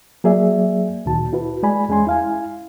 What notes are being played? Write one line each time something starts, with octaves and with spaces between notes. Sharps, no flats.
F#3 A#3 G#4 D5 E5
D2 A#2 D#3 F#4 A5
E4 F#4 B4
G#3 D5 G#5 B5
E2 G#3 C#4 G#5 C6
E4 F5 G#5